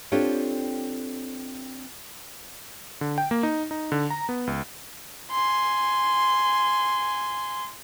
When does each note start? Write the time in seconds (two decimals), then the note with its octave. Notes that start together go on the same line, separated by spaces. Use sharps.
0.12 C4 D4 F4 G4 A4 C#5
3.01 D3
3.18 G5
3.31 A#3
3.43 D#4
3.71 D#4
3.92 D3
4.11 A#5
4.29 B3
4.47 C#2
5.31 G#5 C6